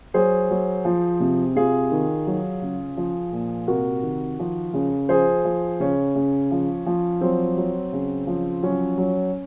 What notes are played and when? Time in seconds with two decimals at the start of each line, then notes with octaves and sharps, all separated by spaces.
0.14 F#3 G#4 C5
0.51 F#3
0.85 F3
1.20 C3
1.56 C3 F4 G#4
1.92 D#3
2.27 F#3
2.62 C#3
2.97 F3
3.32 A#2
3.67 C3 F#4 A#4
4.03 D#3
4.39 F3
4.74 C#3
5.09 F3 G#4 C5
5.45 F3
5.80 C#3 C#4
6.15 C#3
6.51 F3
6.86 F3
7.21 F#3 C4
7.57 F#3
7.93 C#3
8.27 F3
8.63 F#3 C#4
8.98 F#3